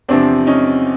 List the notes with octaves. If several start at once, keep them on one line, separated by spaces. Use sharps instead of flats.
E2 C3 F3 C4 D4
C#4 D#4